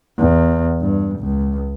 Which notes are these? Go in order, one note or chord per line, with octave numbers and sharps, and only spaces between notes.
E2
G2
C#2